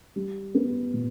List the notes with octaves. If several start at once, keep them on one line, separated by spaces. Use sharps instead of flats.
G3
B3
A#2